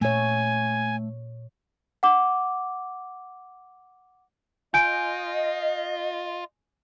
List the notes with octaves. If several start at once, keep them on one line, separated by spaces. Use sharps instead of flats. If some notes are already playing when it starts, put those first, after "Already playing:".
A#2 A3 C#5 E5 G#5
F#5 D6
F4 D#5 G#5 G6 D7